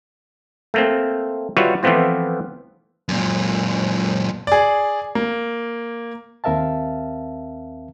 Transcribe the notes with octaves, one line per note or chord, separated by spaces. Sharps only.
A3 A#3 C4
G3 F4 F#4 B4 C#5 E5
E3 F3 A3 B3 C4 F4
F#2 A#2
G#4 D5
A#3
D#2 C4 A#4 E5 F5 A5